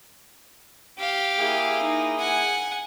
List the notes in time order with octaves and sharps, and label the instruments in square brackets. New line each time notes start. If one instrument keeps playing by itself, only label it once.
[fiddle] G4 F5
[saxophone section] A#3 E4 G#4
[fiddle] D#4
F#5 G#5